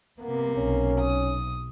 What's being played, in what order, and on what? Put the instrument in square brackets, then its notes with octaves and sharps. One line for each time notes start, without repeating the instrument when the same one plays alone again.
[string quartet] C3 A#3 [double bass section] B3
[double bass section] B1 [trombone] C#4
[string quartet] D#6